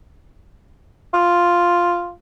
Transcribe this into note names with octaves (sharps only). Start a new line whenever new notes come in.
F4